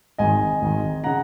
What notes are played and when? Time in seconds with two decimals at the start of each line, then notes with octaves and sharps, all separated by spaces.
0.18 G#1 G#2 D#3 D#5 G#5
0.62 G#1 G#2 D#3
1.04 C#3 F#5 A#5